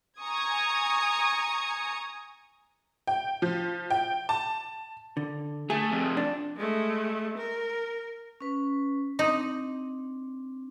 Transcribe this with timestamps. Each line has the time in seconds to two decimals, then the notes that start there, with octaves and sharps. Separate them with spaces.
0.19 G#5 A#5 C#6 D#6 G#6
3.07 G5
3.42 F3
3.90 G5
4.29 A5
5.17 D3
5.70 A3 G#4
5.92 F2 C3
6.17 D4
6.56 G#3 A3
7.38 A#4
8.41 C#4 B4
9.19 C4 D4 D#4